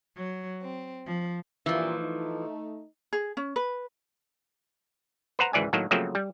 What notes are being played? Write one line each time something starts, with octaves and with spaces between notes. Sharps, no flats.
F#3
C4
F3
G2 A#2 E3 F3
A3 D#4
G#4
C#4
B4
B4 C5 F#5 A#5
G#1 C#2 E3 D5 G#5
A2 D#3 F#3 A#3
C#3 F3 F#3 A3 A#3 C4
G3